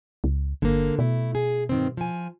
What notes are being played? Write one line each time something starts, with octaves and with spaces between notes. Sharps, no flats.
C#2
G1 D3 A#3
B2 A3 E4
G#4
G2 D#3 C4
F3 G#5